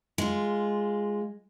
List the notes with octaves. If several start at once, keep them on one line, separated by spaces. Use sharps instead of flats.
G#3 F4